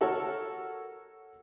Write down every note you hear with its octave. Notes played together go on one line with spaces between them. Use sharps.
F#4 A4 A#4 C#5